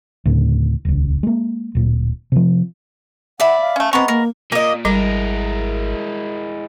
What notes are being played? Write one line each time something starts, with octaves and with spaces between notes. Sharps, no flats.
D2 A2 C#3
D#1 C#2
G#3 A#3
D1 A#2
C3 F3
D5 E5 F#5 B5
F5
A3 C#4
G#3 B3 C4 A#5 C6 C#6
A#3 A#4
A#2 A#3 D#5
G#1 G3 G#3 E4 A#4